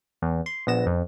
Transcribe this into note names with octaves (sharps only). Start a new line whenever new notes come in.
E2
C6
A#1 B3 A#6 E7
F2